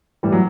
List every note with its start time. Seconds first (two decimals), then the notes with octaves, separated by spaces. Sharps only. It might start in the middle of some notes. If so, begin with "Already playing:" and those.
0.23 A2 E3 G3
0.32 F#3